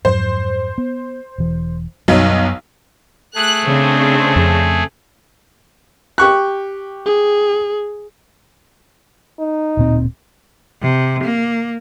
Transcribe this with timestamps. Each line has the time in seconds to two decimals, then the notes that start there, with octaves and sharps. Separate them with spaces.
0.05 F2 G#2 F#3 C5
0.78 B3
1.38 E1 E3
2.08 B1 F#2 F#3 G3 D#4
3.35 A3 G#4 F#6
3.66 C#3 C4 D4
4.36 F2
6.18 G4 C#6 F#6
7.06 G#4
9.40 D#4
9.77 D1 A#2 C4
10.82 C3
11.24 A#3